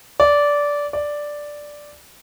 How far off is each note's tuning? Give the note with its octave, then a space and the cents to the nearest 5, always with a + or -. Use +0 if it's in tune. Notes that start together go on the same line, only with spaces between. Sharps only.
D5 -15
D5 +0